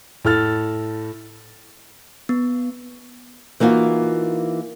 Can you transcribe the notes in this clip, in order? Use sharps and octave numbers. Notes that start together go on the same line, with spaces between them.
A2 A4 F6 A6
B3
E3 A#3 D#4 F4 F#4